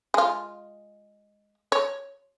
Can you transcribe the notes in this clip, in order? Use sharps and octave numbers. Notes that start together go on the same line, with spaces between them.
G#3 F4
C#5